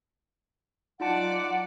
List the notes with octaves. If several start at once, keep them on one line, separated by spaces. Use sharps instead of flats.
F#3 D#4 F4 D5 F#5 A5 D6